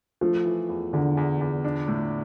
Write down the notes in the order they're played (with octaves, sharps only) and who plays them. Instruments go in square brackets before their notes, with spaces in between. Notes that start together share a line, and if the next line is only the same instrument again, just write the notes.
[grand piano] F3 [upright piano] A3
[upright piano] E3
E2
[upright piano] E2 [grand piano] D3
[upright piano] E2
E2
D4
A2